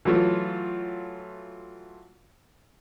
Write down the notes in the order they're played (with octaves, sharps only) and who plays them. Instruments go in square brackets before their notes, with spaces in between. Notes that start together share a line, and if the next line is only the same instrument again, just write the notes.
[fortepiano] E3 F#3 A3 F4